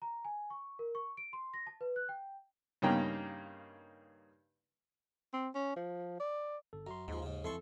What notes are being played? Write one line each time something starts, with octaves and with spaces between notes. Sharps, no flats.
A#5
G#5
C#6
A#4
C#6
D7
C6
A#6
A5
B4
F#6
G5
G2 C#3 A#3 D#4 G5
C4
C#4
F3
D5
G1 A4
F#2 A#5 C6
D#2 G#2 F3
G#2 C#3
F2 E3 A4 C6 C#6